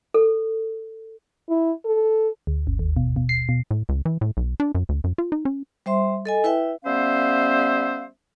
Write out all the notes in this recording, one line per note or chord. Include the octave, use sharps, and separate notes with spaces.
A4
E4
A4
D2
G1
D#2
B2
B2
C7
B2
A2
C#2
E3
A2
B1
D4
F#2
D2
F#2
F4
D#4
C#4
G3 C5 E5 C6
A4 D#5 G#5
E4 B4 E5 G5
G3 B3 C#4 C5 E5 F5